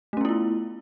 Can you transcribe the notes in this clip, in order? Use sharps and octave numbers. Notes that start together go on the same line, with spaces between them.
A3 B3 C#4 E4 F4